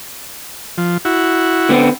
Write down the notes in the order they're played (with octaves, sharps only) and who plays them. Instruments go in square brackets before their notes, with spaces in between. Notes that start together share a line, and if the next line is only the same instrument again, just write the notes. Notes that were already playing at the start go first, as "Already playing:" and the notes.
[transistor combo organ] F3
E4 F#4
[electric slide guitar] D3 B3 C4